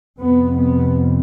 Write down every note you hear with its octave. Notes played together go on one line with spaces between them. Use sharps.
F2 C3 B3
B3